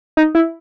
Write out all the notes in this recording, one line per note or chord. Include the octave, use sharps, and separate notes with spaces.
D#4
E4